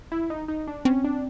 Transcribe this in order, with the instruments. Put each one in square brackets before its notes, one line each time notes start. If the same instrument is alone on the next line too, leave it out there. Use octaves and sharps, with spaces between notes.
[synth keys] E4
D#4
D#4
D4
[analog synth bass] C4 [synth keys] C#4
[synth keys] D4